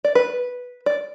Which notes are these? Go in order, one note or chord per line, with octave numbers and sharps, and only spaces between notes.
D5
B4
D5